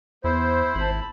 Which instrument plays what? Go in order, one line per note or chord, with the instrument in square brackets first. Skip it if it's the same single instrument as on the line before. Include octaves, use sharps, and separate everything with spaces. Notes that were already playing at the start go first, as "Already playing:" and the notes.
[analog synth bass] E2 [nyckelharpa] B3 [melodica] E4 [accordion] C5
[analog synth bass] G#1 [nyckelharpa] A5 B5